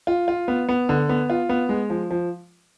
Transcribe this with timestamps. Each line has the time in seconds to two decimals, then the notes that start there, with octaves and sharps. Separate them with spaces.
0.07 F4
0.28 F4
0.48 B3
0.69 B3
0.89 D3
1.09 B3
1.30 F4
1.49 B3
1.69 G#3
1.90 F3
2.10 F3